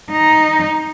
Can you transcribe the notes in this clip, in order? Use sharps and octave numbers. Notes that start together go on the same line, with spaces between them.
D#4